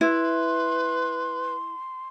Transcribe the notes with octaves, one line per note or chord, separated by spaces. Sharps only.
E4 B4 C6